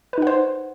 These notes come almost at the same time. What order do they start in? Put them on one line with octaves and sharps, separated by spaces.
B4 D#4 F#5 C5